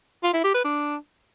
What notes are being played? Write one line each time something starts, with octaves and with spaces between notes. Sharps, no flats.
F4
E4
G4
B4
D4